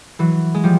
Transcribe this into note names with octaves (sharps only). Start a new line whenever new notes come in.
E3 F#3
G#3
F3 G3